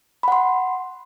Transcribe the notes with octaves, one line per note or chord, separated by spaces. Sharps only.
F#5 B5 C6